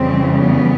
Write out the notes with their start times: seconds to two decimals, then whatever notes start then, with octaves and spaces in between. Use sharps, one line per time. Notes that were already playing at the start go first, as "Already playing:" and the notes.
Already playing: F2 C#3 E3 G3 C4
0.42 B3